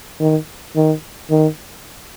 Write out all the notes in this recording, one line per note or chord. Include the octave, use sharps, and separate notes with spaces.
D#3
D#3
D#3